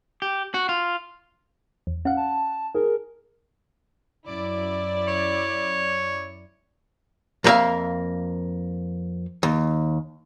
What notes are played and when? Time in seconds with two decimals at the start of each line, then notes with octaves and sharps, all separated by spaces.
0.22 G4
0.54 F#4
0.69 F4
1.87 E2
2.05 C#4 F5 F#5
2.17 A5
2.75 G#4 A#4
4.27 F#2 E4 D5
5.08 C#5
7.44 F2 A#3 D#4 G#4 E5 F5
9.43 D#2